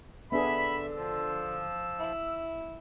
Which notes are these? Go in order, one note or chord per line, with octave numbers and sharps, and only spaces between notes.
D3 B3 D4 G#4 E5 B5
F3 E6
E4